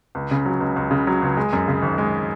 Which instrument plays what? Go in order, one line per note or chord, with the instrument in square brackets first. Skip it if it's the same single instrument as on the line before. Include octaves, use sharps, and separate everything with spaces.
[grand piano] C#2
C#3
F#3
C#2
C#2
C#3
F#3
C#2
G#3
F#2
C#3
G#1
G#3